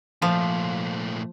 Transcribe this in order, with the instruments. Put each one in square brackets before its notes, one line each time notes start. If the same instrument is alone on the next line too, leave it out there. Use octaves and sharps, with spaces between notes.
[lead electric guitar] A#2 A3 [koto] F3